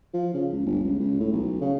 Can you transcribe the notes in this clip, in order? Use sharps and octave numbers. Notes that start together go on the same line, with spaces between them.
F3
C#3
C#2
G1
C#2
C#2
A2
B1
C#3